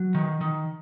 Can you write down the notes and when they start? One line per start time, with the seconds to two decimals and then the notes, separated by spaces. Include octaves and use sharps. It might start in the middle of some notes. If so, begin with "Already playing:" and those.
Already playing: F#3
0.15 D#3
0.41 D#3